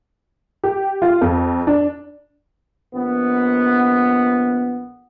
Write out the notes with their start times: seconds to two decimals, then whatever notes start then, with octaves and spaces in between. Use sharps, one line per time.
0.64 G4
1.02 F4
1.21 F2
1.67 D4
2.93 A#1 B3